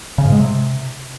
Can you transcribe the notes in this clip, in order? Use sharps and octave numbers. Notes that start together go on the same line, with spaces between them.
C#3
G#2
G#3
C3